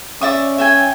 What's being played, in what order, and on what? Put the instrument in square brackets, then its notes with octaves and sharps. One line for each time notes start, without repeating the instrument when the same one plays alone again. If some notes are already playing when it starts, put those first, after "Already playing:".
[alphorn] C#4 [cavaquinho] D5 E5 D#6
[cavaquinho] E5 G5 G#5